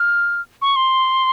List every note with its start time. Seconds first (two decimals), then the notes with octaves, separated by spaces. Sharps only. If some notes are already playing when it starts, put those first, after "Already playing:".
Already playing: F6
0.62 C#6
0.76 C6